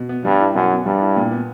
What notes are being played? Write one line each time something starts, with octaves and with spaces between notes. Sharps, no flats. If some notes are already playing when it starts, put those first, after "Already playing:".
Already playing: B2
B3
G2 G3
E4
F#2 B2
B3
G2 G3
E4
A#2
B3